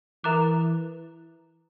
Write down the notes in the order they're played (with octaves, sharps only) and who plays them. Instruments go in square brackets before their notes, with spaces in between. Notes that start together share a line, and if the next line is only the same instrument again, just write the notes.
[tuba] E3 [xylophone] A#4 E5 A#5 D6 F#6